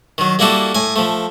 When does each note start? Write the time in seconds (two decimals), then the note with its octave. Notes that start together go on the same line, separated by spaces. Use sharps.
0.18 D#3 F#3
0.39 G3 A#3 E4 F#4 A4
0.75 A2 G#5
0.96 F3 A3